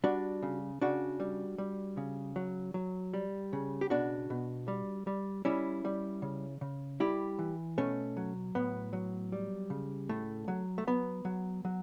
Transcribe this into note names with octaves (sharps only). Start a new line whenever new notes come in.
G3 D4 F#4
C#3
C#3 D4 F#4
G3
G3
C#3
F#3
F#3
G3
C#3
G4
B2 D4 F#4
B2
G3
G3
G3 C#4 E4
G3
C#3
C#3
G3 E4 G4
E3
B2 A3 C#4
F#3
A2 B3
F#3
G3
C#3
A2 A3
F#3
A3
F#3 B3
F#3
F#3